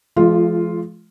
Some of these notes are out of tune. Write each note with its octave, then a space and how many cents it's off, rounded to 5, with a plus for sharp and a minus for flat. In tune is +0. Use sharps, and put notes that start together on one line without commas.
F3 -30 G#3 +45 F4 +0